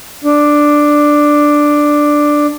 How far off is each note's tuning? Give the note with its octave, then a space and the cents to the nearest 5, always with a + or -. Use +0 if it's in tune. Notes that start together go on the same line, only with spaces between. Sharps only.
D4 +5